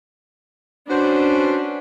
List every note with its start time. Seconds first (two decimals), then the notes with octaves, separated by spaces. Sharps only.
0.90 C#4 D4 F#4 B4 C5